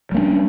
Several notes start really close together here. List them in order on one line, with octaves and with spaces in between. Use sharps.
G3 A#3 D4 C#4